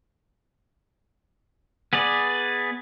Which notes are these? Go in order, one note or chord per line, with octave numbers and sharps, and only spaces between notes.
B3 G#4 B4 D5